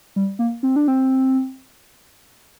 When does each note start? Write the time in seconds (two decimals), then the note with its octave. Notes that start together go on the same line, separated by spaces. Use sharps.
0.16 G3
0.39 A#3
0.63 C4
0.76 D4
0.88 C4